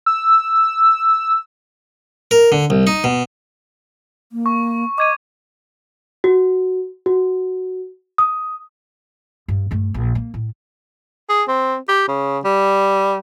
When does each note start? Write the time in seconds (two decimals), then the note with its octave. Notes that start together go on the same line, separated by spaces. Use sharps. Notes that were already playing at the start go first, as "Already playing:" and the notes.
0.06 E6
2.31 A#4
2.52 D3
2.70 C2
2.87 D#4
3.04 B2
4.32 A#3
4.46 C#6
4.98 D#5 D6 G#6 D#7
6.24 F#4
7.06 F#4
8.18 D#6
9.48 G2
9.71 G2 A3
9.94 A#1
10.15 A#3
10.34 A2
11.29 G#4
11.48 C4
11.89 G4
12.08 C#3
12.45 G3